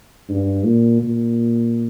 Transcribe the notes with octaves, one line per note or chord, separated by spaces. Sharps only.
G2
A#2
A#2